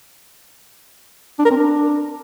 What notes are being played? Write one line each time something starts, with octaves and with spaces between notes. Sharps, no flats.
D4
A#4
C4
D4